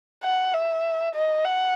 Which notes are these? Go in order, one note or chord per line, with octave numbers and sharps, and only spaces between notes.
F#5
E5
D#5
F#5